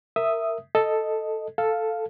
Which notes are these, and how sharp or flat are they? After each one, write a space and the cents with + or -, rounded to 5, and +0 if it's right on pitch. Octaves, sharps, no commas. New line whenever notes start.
A#4 -15 E5 +0 D#6 +0
A4 +0 D#5 +0
A4 +0 F5 +0